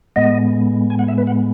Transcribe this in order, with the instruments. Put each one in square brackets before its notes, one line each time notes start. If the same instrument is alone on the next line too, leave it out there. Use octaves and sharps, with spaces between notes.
[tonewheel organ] A2 G#3 B3 D#5
G#5
F#5
E5
B4
F#5